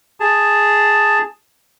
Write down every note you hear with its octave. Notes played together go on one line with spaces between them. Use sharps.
G#4 A5